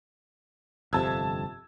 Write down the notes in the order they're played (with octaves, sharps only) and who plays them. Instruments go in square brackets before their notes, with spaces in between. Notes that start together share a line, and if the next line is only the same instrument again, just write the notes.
[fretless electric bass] G1 F2 C3 [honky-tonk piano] A5 E6 G#6